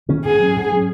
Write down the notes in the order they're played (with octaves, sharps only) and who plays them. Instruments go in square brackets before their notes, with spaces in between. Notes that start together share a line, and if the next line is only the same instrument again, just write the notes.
[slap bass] D#3 A#3 C#4
[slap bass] G#2 [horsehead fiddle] G#4
[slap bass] F#3 C#4
G#2
F#3 C#4